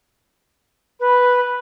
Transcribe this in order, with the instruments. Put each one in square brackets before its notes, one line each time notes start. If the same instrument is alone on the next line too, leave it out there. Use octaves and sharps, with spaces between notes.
[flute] B4